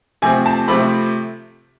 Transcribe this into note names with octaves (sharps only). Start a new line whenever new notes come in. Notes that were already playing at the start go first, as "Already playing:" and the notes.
C3 F3 A3 C4 G#5
A5
C3 F3 A3 C4 B5